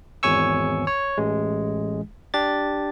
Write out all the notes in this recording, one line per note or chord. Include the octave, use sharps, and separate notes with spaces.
G#1 E2 C#5 G#5 C#6 E6
C#5
A1 G#3
D4 G4 A6